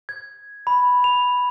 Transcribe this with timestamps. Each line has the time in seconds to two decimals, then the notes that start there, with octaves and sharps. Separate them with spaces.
0.09 G#6
0.67 B5
1.04 F7